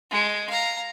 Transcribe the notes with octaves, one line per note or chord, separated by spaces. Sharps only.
G#3
F5 A#5